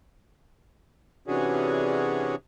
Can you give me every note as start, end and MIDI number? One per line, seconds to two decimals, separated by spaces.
1.27 2.35 48
1.27 2.35 52
1.27 2.35 61
1.27 2.35 62
1.27 2.35 66
1.27 2.35 68